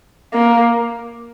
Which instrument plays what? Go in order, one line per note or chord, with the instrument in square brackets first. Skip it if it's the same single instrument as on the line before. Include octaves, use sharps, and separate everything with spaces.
[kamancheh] A#3